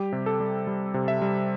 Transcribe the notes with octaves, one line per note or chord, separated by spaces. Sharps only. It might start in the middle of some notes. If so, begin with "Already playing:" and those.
Already playing: G3 G4
C3
A4
G3
G3
C3
E5
G3